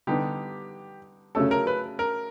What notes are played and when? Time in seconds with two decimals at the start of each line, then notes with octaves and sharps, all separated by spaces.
0.07 D3 G3 B3 D#4 G4
1.35 C#3 F#3 A3 C#4 A4
1.51 A#4
1.67 B4
1.99 A#4